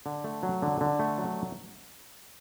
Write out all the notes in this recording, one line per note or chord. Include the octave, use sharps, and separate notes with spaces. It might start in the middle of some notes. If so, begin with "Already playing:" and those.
D3
A3
F#3
D3
D3
A3
F#3